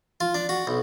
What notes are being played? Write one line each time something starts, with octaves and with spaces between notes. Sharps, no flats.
F4
D4
F#4
B1